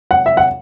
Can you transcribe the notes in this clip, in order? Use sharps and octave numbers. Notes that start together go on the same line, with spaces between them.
F#5
E5
F#5